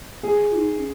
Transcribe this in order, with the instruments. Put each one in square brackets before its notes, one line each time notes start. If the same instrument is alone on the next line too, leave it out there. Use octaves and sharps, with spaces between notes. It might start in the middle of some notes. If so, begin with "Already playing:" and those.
[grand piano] G#4
[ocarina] F4
D#4
C#4